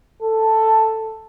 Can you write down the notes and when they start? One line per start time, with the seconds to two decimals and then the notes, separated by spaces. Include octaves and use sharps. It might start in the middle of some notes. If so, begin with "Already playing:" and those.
0.22 A4